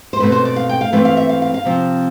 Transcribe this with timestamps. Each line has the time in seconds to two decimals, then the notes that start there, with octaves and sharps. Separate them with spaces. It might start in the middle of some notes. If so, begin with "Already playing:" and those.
0.13 C5
0.20 B2 A3 C4 B4
0.32 C5
0.45 D5
0.56 F5
0.69 G5
0.81 F5
0.93 E3 A3 C4 F5
1.05 F5
1.17 E5
1.29 F5
1.42 F5
1.54 F5
1.65 C3 F3 C4